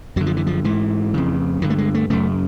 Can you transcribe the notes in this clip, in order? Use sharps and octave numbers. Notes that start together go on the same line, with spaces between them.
F#2 D3 F#3
F3
E3
F3
G#2 E3
F2 C#3
G2 D3 D#3
A3
G#3
A3
F#2 C#3 A3